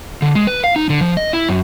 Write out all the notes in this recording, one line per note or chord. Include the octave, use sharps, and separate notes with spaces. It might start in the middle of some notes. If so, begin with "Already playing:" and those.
D3
G#3
B4
F5
D#4
D3
F3
D#5
E4
F#2